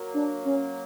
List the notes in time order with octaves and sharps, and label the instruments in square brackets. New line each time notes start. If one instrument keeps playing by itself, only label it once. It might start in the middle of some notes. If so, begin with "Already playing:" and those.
Already playing: [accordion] F#3 A#3
[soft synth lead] D4
C#4